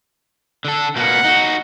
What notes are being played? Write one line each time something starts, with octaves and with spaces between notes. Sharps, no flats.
D3 A4
B2 A#3 F#5
D#4 F#4